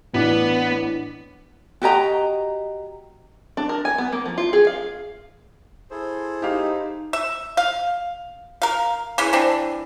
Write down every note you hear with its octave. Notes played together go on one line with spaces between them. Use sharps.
A1 B3 D4 D6
F#4 G4 D#5 A#5
D4
A#4
G#5
B3
A#3
F3
F4
G#4
F5
E4 G#4 A4 C5
D#4 G4 F5
E5
F5
A#4 F5
E3 G#3 C#4
E3 C4 D4